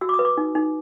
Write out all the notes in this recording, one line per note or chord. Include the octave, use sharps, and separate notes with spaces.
F#4 E6
D6
D#6
B4
D6
D#4
D#4